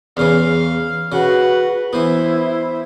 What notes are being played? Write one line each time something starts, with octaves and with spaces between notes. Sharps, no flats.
E2 C#3 E3 F5
C#3 F#4 B4 F#5
E3 B3 E4 C5